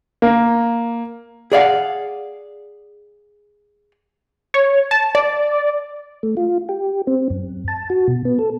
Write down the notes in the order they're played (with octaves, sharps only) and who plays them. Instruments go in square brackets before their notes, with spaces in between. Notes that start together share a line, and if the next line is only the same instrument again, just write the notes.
[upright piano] A#3
[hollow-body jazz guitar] G#4 D5 F5 F#5
[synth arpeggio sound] C#5
A5
D5
[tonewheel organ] A3
F4
G4
C4
F#2
A5
F#4
B2
B3
A4